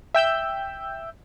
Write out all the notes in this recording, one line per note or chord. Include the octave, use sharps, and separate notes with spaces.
E5 G5 E6 G6